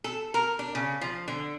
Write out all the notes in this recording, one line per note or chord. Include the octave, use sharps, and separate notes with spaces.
A4
A#4
D4
C#3
F3
D3